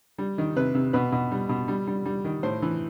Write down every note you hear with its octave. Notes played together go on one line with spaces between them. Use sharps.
G3
D#3
C3 B4
C3
B2 B4
B2
G3
B2
G3
G3
G3
D#3
A2 C5
E3